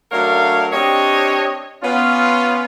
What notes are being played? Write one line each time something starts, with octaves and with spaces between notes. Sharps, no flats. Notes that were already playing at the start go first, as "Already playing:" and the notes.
F#3 A3 D4 A#4 C#5 F5
C4 D4 G4 C#5 D#5
B3 C#4 F4